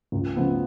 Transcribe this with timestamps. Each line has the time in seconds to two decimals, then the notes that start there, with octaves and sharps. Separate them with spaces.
0.12 C#2
0.37 C#3 F3 B3